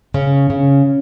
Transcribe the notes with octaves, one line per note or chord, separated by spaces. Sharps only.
C#3 C#4
C#3